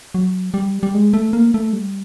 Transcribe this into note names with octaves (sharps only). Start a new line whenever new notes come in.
F#3
G3
G3
G#3
A3
A#3
A3
G3